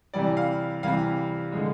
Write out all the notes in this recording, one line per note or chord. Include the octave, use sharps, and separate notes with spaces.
C3 E3 G3 D5
F5
C3 E3 G3 F5
D3 F3 G#3